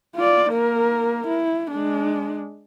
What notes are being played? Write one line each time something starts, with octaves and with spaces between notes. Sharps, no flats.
F4 D5
A#3 A#4
E4
G#3 D4